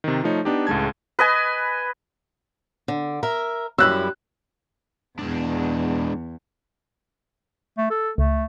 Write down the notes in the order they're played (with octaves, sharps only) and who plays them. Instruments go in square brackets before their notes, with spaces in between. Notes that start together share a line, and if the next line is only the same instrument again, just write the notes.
[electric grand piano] C3 D#3
F3 A3 D#4 C#5
B3 D4 D#4 G4
C#2 A2 G#3 A5 G#6
[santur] B4 D#5 G#5
[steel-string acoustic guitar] D3
A#4 E5
[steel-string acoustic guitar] F#2 G3 E4 [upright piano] E6 F#6
[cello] E2 [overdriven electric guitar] G#3 D4
[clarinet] A3
A4
[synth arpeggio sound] C#2 [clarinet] A3